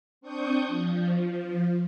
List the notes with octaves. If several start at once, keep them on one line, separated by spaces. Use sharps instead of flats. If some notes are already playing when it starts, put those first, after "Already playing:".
C4 D4 C#6 D#6 G6
F3